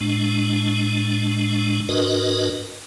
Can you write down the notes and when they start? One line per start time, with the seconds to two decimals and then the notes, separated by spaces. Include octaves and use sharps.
0.01 A2 G#3 D4
1.89 G#2 D4 F#4 A#4 B4 D#5